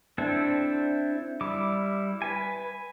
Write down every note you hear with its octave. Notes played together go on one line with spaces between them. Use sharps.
C4 D4 E4 A4
G3 E4 D6
B4 G#5